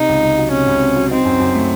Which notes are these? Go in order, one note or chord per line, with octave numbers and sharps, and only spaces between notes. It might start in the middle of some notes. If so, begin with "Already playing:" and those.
Already playing: C3 D#4
C#2
C#2
F#3
C3 C#4
C#2
C4
F#3
C4 D#4
F#2
F#2
A3